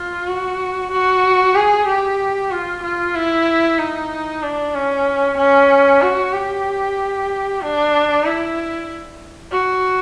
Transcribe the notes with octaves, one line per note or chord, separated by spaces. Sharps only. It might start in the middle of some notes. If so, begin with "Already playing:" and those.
Already playing: F4
F#4
F#4
G#4
G4
F4
F4
E4
D#4
D4
C#4
C#4
F#4
G4
D4
E4
F#4